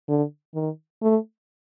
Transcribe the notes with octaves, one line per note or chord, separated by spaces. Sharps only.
D3
D#3
A3